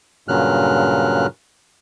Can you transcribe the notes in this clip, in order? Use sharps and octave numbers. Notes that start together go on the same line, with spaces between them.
G2 A#2 C#3 F#3 F6 F#6